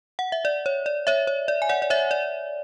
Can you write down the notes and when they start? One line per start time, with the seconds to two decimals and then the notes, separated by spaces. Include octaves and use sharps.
0.19 F#5
0.32 E5
0.45 D5
0.66 C#5
0.86 D5
1.07 C#5 E5
1.27 C#5
1.48 D5
1.62 G#5
1.69 D5 F#5
1.82 D5
1.90 C#5 E5
2.11 D5